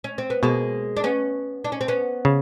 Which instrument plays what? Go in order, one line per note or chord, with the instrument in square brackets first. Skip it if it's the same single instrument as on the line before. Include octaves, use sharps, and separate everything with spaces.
[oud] C#4
C4
B3
[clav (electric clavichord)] B2 [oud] G#3 A#3
[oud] D4
B3 C#4
D4
C#4
C4
B3 C#4
[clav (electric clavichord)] C#3